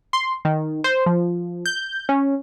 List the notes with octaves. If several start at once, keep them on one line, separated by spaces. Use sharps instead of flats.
C6
D#3
C5
F3
G6
C#4